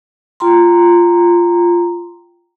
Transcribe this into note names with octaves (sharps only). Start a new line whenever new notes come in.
F4 G5 A#5 C6